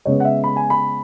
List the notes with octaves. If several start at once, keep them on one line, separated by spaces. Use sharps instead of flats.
C#3 G#3 B3 C#5
F#5
E5
B5
G#5
B5